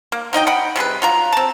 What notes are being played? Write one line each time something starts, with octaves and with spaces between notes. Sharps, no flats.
A#3
F#3 D#4 D#5 G5
F#5 G5 B5
C3 G3 G#4 B4
F#3 F4 A#5
C4 A5